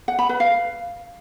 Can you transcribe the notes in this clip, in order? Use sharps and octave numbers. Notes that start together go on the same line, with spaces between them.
F#5
B5
B4
F5